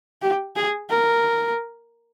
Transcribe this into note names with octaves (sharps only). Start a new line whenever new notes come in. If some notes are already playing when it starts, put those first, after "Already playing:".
G4
G#4
A#4